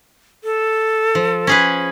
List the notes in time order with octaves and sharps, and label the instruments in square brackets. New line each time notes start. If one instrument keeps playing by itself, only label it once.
[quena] A4
[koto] F3
C#4 G#4 B4